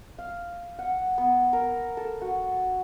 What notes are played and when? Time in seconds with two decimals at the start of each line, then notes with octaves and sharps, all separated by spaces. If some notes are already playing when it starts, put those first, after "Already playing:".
0.18 F5
0.79 F#5
1.18 B3
1.53 A#4
1.97 A4
2.21 F#4